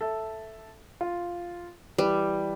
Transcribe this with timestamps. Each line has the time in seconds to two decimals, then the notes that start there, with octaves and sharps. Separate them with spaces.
0.01 A4 E5
1.01 F4
1.98 E3 G3 B4